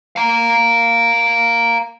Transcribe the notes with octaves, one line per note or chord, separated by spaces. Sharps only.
F5 A#5